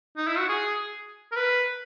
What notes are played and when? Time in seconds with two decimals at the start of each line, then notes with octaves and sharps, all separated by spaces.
0.17 D#4
0.28 E4
0.38 F#4
0.49 G#4
1.32 A#4
1.36 B4